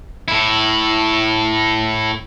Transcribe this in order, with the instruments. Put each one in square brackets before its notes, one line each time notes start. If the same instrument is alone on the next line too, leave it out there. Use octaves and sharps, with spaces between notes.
[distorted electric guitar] A2 E4